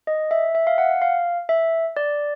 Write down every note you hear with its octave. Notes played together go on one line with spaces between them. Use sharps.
D#5
E5
E5
F5
F#5
F5
E5
D5